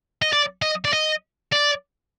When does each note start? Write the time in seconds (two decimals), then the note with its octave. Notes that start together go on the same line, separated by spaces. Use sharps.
0.22 D#5
0.33 D5
0.62 D#5
0.85 D5
0.93 D#5
1.52 D5